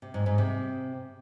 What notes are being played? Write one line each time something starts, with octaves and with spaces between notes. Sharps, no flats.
C3
G#2
G#2
C3